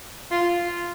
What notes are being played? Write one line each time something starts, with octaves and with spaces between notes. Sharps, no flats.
F4